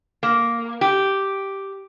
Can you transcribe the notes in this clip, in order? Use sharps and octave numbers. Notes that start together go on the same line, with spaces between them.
A#3
G4